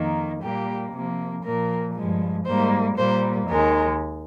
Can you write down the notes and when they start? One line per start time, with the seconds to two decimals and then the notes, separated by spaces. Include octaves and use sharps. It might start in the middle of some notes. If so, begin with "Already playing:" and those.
Already playing: F2 D#3 A#3
0.42 A#2 G3 A#3 G4
0.93 C3 F3 A#3
1.44 A#2 F3 A#3 A#4
1.95 G2 F3 G#3
2.45 G#2 G3 A#3 C5
2.97 A#2 G3 A#3 C5
3.48 D#2 D#3 G#3 A#4